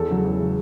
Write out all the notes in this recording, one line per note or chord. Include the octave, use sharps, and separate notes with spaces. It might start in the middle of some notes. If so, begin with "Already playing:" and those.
Already playing: E2 A4
C#3 F#3
E2
C#3 F#3